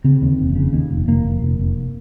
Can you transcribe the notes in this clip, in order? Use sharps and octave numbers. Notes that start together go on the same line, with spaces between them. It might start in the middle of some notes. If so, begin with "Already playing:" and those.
C#3 C4
D#2
F1
C#3
D#2
F1
F1 A#3
F1
F1
F1